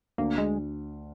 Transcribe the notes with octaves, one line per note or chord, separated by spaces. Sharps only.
D2 A#3
G#3